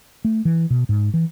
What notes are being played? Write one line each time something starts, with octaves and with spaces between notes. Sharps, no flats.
A3
E3
B2
G#2
E3